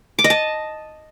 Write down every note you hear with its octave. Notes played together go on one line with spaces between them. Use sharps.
D6
D#5
A5